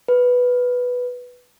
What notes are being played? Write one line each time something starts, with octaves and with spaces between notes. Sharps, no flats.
B4